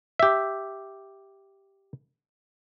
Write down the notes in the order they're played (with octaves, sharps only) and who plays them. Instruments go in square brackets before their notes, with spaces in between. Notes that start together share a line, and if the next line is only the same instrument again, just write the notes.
[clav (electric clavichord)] G4 E5